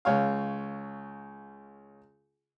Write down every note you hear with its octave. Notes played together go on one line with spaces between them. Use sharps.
C#2 C#5 F5